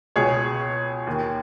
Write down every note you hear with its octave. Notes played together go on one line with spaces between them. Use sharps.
C#2 B2 G#4 C#5
D#2 D#3